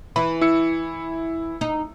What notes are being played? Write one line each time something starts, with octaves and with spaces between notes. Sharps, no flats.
E3 B5
E4 E6 C#7
D#4